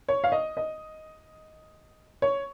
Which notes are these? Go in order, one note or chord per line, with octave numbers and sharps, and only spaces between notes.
C#5
F5
D#5
D#5
C#5